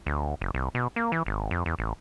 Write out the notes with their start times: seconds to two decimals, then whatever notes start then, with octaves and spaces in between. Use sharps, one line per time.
0.06 D2
0.41 F#1
0.54 C2
0.75 B2
0.96 A#3
1.12 E3
1.26 G#1
1.51 F2
1.66 E2
1.79 A1